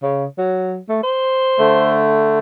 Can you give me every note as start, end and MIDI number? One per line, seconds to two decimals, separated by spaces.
0.03 0.25 49
0.38 0.78 54
0.89 0.98 57
1.03 2.01 72
1.59 2.39 50
1.59 2.39 57